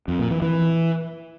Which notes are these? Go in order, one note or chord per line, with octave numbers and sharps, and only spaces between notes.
F2
A#2
E3
E3